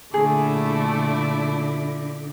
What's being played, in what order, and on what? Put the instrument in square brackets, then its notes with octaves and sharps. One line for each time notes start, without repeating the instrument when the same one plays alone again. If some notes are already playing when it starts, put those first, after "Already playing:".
[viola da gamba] A#2 E4 D5 [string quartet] D3 [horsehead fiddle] A3 [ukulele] G#4